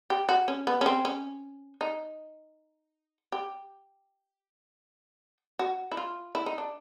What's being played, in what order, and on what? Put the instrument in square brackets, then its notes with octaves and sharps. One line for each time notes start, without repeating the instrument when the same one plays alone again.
[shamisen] G4
F#4
C#4
B3
C#4
C4
C#4
D#4
G4
F#4
E4
F4
E4
D#4
D4